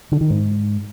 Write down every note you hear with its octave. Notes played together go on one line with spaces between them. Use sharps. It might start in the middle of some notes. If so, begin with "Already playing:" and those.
D3
D#3
G#2